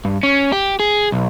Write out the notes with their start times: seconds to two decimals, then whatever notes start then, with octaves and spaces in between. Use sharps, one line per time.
0.05 G2
0.23 C#4
0.52 G4
0.80 G#4
1.12 B1